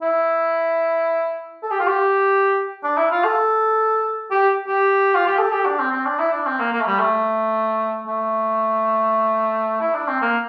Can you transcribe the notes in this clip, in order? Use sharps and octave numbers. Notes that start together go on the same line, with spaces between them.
E4
A4
G4
F4
G4
D4
E4
F4
A4
G4
G4
F4
G4
A4
G4
D4
C4
C4
D4
E4
D4
C4
A#3
A#3
A3
G3
A3
A3
E4
D4
C4
A#3